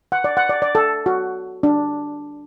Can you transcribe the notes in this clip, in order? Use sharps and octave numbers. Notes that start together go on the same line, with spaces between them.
F#5
D5
F#5
D5
D5
A4
F#4
D4